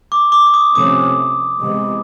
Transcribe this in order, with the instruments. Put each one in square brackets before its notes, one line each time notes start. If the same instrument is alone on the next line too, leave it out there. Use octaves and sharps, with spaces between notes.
[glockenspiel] D6
D6
D6
D#6
[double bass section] C3 F3 A3 C#4 [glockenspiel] D#6
[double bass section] C3 E3 G#3 B3